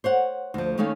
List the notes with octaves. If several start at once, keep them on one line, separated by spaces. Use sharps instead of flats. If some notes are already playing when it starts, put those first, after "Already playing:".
C5 C#5 F#5
D2 F3
D#2 D#3 A3 C#4 C#5 F5